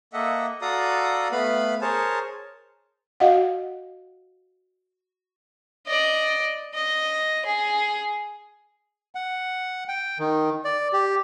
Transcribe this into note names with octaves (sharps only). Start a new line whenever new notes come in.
A#3 A4 D#5 E5 F#5
F#4 A4 D5 F5 A#5 D#6
A3 B3 B4 F5 B5
G#4 A#4 C5 C#5 A5
F#4 D#5 F5 F#5
D5 D#5
D#5
G#4
F#5
G5
D#3
D5
G4